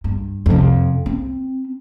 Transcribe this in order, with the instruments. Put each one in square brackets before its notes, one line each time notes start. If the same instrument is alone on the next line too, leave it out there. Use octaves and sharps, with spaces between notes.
[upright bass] G2
F2 C3
C4